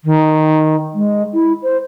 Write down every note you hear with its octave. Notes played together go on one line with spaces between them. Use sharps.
D#3
G#3
E4
C5